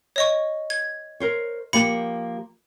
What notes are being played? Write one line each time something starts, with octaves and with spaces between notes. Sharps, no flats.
C#5 D#5 C#6
G#6
A#4 C5 C#5
F3 A#3 G4 B5 C#7